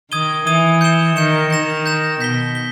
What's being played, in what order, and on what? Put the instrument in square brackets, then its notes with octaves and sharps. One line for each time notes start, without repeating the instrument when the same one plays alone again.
[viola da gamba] D#3 [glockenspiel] D#6 G#6 D#7 G7
[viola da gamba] E3 [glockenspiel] D#6 G#6 D#7 G7
[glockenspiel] G6 C#7 E7 G7
[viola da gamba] D#3 [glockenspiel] G6 C#7 E7 G7
[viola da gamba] D#3 [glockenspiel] G6 A#6 E7
[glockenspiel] G6 A#6 E7
[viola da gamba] B2 [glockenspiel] G6 B6 G7
[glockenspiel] B6 G7